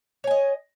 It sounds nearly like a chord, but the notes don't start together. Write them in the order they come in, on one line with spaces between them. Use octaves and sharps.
C#5 G#5 D#5